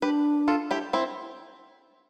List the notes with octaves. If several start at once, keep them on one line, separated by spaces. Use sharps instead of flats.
D4 G4 B4
F4 A4
E4 G4
C4 E4